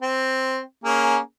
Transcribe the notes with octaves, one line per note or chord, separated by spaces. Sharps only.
C4
A#3 C#4 G#4